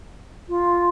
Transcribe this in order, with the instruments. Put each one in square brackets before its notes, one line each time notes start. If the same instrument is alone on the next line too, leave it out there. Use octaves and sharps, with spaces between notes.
[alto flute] F4